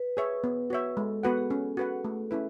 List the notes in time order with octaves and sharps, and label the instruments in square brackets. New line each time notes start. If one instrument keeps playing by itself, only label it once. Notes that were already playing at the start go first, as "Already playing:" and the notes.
Already playing: [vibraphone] B4
[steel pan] G#4 C#5 E5
B3
F#4 C#5 E5
[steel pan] G#3 [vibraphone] A4
[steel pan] B3 F#4 B4 F#5 [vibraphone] G#4
[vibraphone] G#4
[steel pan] C#4 [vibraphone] G#4
[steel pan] F#4 B4 F#5
A3
C#4 E4 B4